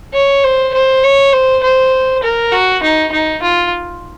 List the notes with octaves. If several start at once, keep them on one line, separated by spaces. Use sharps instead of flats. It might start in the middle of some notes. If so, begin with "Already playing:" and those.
C#5
C5
C5
C#5
C5
C5
A#4
F#4
D#4
D#4
F4